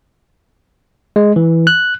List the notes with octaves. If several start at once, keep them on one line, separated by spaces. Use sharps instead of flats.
G#3
E3
F#6